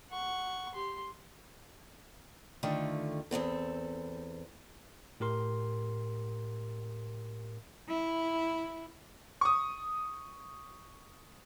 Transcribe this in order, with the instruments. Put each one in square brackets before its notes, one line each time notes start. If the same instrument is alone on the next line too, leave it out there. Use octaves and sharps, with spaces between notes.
[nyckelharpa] F#5 C#6
G4 C6
[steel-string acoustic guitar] D3 D#3 A3 F4
E2 G2 C4 A4
[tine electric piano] A2 G4 A#4 C6
[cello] E4
[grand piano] C#6 D#6